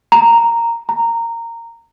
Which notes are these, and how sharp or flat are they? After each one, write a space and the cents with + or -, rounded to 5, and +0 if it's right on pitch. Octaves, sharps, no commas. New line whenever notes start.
A#5 -5
A#5 -15